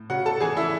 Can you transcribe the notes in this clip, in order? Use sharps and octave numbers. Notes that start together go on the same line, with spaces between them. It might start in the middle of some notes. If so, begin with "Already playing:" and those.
Already playing: A2
C#3 F#4 F#5
A4 A5
E3 G#4 G#5
E4 E5